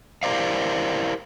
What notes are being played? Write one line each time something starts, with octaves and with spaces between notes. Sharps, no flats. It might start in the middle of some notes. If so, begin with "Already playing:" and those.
E4 G4 A#4 C5 D5 F5